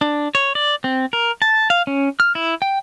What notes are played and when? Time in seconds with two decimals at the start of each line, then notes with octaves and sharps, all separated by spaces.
0.01 D4
0.35 C#5
0.55 D5
0.84 C4
1.13 A#4
1.42 A5
1.70 F5
1.87 C#4
2.20 F6
2.35 E4
2.62 G5